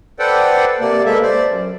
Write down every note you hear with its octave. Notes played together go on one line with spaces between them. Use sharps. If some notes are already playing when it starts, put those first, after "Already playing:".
A4 B4 C5 D5 F#5 G5
C3 A#3 D5
G#3 A#3 B3 A4 E5
C5 D5
F#2